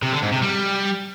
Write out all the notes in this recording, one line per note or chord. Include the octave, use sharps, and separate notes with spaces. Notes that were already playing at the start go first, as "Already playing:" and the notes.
C3
D3
G#2
C3
G3